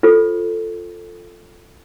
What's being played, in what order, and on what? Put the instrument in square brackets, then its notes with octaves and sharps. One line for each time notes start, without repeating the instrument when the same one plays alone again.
[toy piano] F4 A4 C5